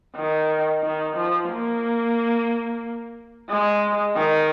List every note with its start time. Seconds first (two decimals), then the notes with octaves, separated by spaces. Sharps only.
0.16 D#3
0.83 D#3
1.16 F3
1.50 A#3
3.49 G#3
4.15 D#3